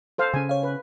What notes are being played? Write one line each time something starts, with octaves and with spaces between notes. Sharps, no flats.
A4 C5 F5
C#3 C#4 G#5
C#5 F5
B4